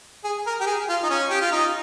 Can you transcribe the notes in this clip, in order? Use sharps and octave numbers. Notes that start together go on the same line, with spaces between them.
G#4
A#4
G4
G#4
F4
D#4
C#4
G4
F4
D#4